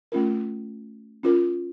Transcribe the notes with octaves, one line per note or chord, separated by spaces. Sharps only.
A3 C#4 F4 A#4
C#4 F4 A#4